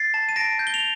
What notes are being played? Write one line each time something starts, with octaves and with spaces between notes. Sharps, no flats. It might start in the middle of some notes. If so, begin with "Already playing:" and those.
Already playing: A6 C7
A5
D#7
A5 A#6 D7
G6
G7
F7